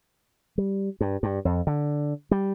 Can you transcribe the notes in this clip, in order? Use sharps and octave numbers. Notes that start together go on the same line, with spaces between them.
G3
G2
G2
F2
D3
G3